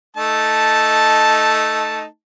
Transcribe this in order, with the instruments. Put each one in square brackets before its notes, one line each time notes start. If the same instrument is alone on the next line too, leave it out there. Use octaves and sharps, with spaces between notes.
[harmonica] A3 D#4 A5